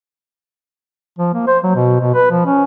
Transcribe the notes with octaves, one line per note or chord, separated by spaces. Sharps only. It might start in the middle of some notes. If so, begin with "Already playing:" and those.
F3
A#3
C5
F#3
B2
B2
B4
F3
C#4